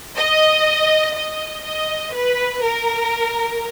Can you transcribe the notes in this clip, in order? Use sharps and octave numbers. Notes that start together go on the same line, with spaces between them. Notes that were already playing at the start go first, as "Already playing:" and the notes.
D#5
D#5
D#5
B4
A#4